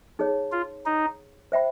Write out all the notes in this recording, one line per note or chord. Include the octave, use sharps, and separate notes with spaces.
D#4 G#4 C#5
F4
D#4
C5 E5 G5 B5